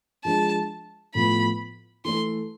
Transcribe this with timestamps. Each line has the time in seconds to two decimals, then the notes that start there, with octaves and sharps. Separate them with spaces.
0.24 F3 G#3 D4 G#4 A5
1.15 A2 F3 B3 B5
2.05 E3 A3 E4 A4 C6